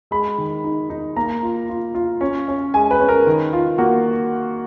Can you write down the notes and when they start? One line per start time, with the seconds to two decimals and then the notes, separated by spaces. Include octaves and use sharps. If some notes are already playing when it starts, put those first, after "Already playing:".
0.11 G#3 B5
0.38 D#3
0.64 D#4
0.90 D#4
1.17 A#3 A#5
1.43 F4
1.69 F4
1.95 F4
2.21 C#4
2.48 C#4
2.74 G#3 G#5
2.91 B4
3.00 C#4
3.09 A#4
3.27 D#3
3.53 F4
3.78 A#3 F#4